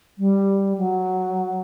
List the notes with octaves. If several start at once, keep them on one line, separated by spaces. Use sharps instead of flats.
G3
F#3